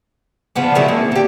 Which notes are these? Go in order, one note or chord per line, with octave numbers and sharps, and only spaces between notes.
C#3 F3 B3 D4
D#3 F#3 G#3 E4
A#3 C4
D3 G4